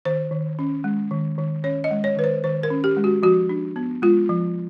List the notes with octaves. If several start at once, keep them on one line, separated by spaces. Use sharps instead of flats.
D#3 C5
D#3
C#4
G#3
D#3
D#3
C#4 C#5
D#5
G#3
C#5
D#3 B4
C5
D#3 C5
A#4
C#4
G4
G#3
F#4
F3 F#4
D4
B3
G#3 F4
F3